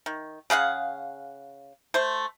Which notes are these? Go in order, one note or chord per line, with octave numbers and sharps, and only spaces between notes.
D#3
C#3 G#4 F5 F#5
A3 C5